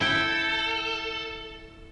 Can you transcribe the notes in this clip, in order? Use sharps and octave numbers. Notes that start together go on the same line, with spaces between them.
E4 A4 G5